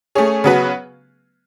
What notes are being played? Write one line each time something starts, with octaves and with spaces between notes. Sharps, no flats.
A3 C#4 G#4 C#5
C#3 F#3 B3 F#4 B4